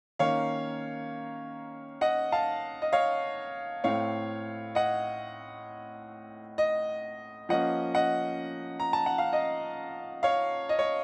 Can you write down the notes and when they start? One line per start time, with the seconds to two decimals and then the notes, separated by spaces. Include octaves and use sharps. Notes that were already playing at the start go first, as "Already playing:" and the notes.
0.19 D#3 A#3 C#4 C#5 F5
2.01 D#5 F#5
2.32 F5 A5
2.82 D#5
2.93 C#5 F5
3.84 A2 A3 C4 C#5 F5
4.75 D#5 F#5
6.58 D#5
7.49 F3 A#3 C#4 D#5 F#5
7.95 D#5 F#5
8.80 A#5
8.93 A5
9.06 F#5
9.18 F5
9.33 D#5
10.23 C#5 F5
10.69 D#5
10.79 C#5